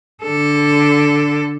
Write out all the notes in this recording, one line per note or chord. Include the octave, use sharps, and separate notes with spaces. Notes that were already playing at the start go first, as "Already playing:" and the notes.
D3 A4